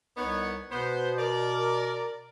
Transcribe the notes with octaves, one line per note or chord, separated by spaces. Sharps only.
C2 B3 D#4 C#5
B2 B3 C5
A#4 D5